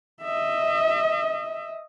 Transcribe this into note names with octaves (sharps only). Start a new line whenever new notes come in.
D#5 E5